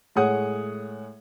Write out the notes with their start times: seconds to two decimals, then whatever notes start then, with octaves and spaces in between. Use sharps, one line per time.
0.16 A2 G#3 G#4 C#5 F#5 D#6